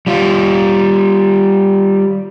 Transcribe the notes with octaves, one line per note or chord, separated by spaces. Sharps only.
G3 F4